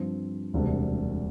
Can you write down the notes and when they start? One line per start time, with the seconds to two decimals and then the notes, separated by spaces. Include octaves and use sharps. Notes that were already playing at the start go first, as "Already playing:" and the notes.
Already playing: G2 F3 C4
0.54 E1 D2 C3 G3 D4